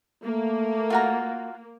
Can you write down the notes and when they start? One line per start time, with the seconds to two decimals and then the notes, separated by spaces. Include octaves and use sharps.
0.24 A3 A#3
0.90 F4 F#4 A#5